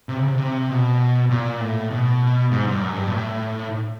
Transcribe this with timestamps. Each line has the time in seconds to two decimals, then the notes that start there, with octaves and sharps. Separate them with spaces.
0.09 C3
0.19 C#3
0.28 C3
0.35 C#3
0.39 C3
0.69 B2
1.31 A#2
1.60 A2
1.91 B2
2.51 G#2
2.67 G2
2.81 F#2
2.97 G2
3.07 A#2
3.12 A2